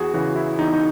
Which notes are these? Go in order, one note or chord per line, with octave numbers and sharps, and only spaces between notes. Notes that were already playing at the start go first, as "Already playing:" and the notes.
Already playing: E2 F#4 G#4
C#3 E3 F#4
E4
E2 D#4
D#4